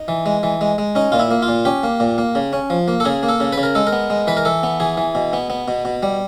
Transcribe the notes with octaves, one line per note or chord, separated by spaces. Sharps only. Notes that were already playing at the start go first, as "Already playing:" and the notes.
Already playing: D#4
E3
G#3
E3
G#3
G#3
C#4 D#4
A#2 F4
E4
A#3
F4
A#2
C#4 G4
A#3
A#2
A#3
C#3
C#4
F3
A#3
A4
C#3 G#4
A#3
A4
C#3
B4
C#3
A#4
G#3 A4
A#4
B3
G#3
E3 B4
A#4
E3 A4
B3
E3 G#4
E3
B2
B3
B3
B2
B2
G3